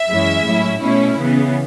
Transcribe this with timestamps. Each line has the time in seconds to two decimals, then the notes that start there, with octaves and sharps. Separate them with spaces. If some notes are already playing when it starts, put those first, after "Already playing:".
Already playing: E5
0.09 F#2 E3 G#3 C#4 E4
0.45 A2 F#3 C#4 E4
0.81 B2 A3 C#4 E4
1.17 C#3 E3 B3